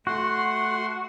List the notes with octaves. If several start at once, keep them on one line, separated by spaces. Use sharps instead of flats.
A3 F#4 F#5 C6